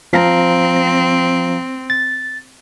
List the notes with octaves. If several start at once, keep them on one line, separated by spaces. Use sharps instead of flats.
F3 C4 F5 A#5
A6